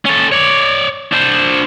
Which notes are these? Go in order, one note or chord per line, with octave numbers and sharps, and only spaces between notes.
C#4 A4
C#5 D5
D4 C5